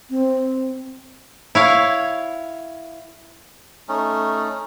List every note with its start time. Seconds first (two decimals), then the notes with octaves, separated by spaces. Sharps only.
0.10 C4
1.55 E4 C#5 F5
3.88 A3 C#4 D#4